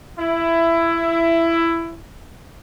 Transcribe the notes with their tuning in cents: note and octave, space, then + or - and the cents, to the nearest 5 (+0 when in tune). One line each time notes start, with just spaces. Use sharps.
E4 +15